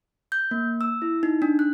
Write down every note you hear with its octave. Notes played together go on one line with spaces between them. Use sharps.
G6
A#3
E6
E4
D#4
D4
F#6